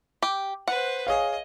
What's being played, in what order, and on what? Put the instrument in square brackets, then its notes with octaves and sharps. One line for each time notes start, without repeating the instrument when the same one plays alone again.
[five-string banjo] G4
[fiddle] B4 C5 [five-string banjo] F#5
[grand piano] G#4 C#5 F5 [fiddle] D#5